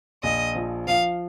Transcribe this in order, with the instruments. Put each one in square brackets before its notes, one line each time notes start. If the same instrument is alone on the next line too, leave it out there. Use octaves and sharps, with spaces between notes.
[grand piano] A#1 [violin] D#5
[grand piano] F3
[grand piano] F3 [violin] F5